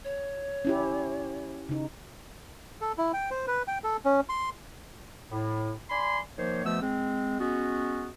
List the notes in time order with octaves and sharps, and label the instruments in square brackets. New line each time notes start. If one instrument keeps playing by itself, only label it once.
[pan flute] C#5
[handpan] C#4 E4 G4
C#3 D#4
[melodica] A4
E4
G5
C5
B4
G5
A4
C#4
C6
[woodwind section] A2
D5 G#5 B5 C6
D#3 F3 A#3 C5 C#5
B2 F3 A3 B3 E6
G#3 C4
G#3 B3 C#4 F#4